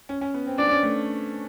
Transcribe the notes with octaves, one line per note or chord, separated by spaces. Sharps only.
C#4
C#4
B3
C4
D4 D5
C#4
A3